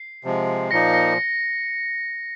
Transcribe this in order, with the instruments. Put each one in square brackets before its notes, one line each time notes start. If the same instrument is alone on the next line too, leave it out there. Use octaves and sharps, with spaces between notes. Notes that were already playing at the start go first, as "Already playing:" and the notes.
Already playing: [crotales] C7
[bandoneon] C3 F3 G#3
[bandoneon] A#2 F3 A#3 D#4 [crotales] A#6 C#7
[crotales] A#6 C#7